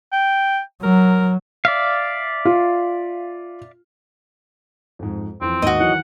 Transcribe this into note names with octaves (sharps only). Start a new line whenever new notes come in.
G5
F#3 A#4
D5 E5 F5
F4
F2 G#2
F2 E3 C4
D#2 G#2 F#4 D#5
D#3 E3 F#3 F#5